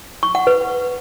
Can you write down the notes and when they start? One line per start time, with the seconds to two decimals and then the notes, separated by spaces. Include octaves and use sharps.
0.23 C#6
0.35 F#5
0.47 B4